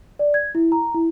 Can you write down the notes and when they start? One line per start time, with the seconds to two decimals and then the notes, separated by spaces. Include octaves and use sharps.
0.19 D5
0.34 G#6
0.55 E4
0.72 A#5
0.94 E4